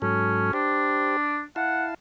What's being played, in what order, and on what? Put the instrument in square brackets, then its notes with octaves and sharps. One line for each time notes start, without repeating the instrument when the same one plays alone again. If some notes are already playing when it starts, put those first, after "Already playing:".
[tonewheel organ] G#2 F#3 A4 [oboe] C#4
[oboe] D4 [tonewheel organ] G4 C5
[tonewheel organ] E4 F5 A5 [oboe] F#5